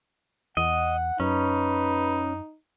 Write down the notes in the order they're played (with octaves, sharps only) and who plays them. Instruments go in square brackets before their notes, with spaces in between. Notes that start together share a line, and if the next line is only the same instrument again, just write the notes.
[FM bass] E2 [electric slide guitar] D#5 [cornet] F#5
[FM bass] F#2 [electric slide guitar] C#4 [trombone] D#4 [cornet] B4